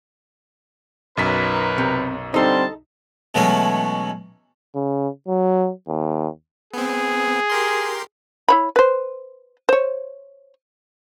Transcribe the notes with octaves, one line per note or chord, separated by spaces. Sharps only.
B1 F#2 D#4 A#4 B4 B6
C3
D3 G3 C4 D#4 A4 F5 A5 C6
B2 E3 F#3 G#3 A3 C#4
C#3
F#3
D#2
B3 C4 G#4
G4 A#4 C6
E4 C#5 B5
B4 C5
C5 C#5